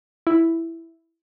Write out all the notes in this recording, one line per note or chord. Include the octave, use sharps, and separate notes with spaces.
E4